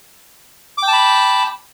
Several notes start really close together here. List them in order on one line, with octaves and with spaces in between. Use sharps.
D6 G5 A5 B5